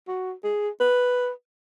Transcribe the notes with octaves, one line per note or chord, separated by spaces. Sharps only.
F#4
G#4
B4